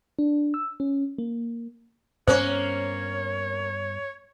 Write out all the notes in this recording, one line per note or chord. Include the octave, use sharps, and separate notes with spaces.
D4
E6
C#4
A#3
G2 A#3 B3 C#4 C5 C#5